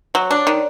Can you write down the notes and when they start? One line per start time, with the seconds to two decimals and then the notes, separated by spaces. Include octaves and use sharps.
0.14 F#3 C#5
0.31 D4
0.36 D5
0.47 D#3